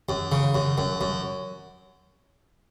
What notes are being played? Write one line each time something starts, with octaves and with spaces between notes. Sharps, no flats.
F#2
C#3
F#2
F#2
F#2